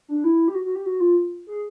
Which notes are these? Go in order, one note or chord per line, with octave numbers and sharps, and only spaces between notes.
D4
E4
G4
F#4
F#4
G4
F#4
F4
G#4